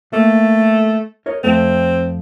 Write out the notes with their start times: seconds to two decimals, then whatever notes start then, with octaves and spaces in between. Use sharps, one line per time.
0.13 A3 A#3
1.26 A#4 C#5 D#5
1.44 F2 A3 C4